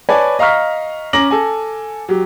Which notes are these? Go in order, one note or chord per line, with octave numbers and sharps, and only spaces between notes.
B4 C#5 D5 G#5 A5
D#5 F5 A#5 C#6 F6 B6
C#4 A#5 D6 A#6 F#7
A4 G#5
F#3 G4